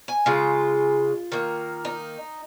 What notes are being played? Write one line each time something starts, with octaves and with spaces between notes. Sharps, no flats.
G#5
C#3 G#3 F4
D#3 A#3
D#4